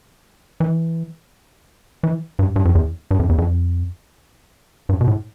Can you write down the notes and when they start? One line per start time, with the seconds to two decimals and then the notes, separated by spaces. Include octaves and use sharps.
0.60 E3
2.03 E3
2.39 G2
2.56 G2
2.65 F2
2.75 E2
3.11 G2
3.20 F2
3.29 E2
3.38 F2
4.89 G2
5.01 B2
5.08 A2